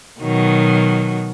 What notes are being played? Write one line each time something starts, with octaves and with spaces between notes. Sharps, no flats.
B2 D#3 F#3